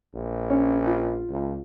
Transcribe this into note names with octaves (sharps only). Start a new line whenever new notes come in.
A#1
C#4 C#5
F4
C#2